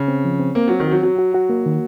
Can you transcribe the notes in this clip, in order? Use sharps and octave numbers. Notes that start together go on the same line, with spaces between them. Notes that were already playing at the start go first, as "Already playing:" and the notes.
Already playing: C#3
C4
F3
C4
A#3 C4
F#3 C4
D#3
F#3 F#4
F#3 F#4
F#4
F#4
A#3
D#3